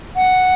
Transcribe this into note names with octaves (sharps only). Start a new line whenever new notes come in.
F#5